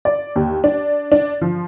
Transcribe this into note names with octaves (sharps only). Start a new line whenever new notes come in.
D5
D#2
D4
D4
F3